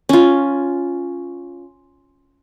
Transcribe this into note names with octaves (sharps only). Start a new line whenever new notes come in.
C#4 F4